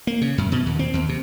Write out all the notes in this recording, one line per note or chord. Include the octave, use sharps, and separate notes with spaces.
A#3
C#3
F#2
B2
D#2
C4
D#2
C3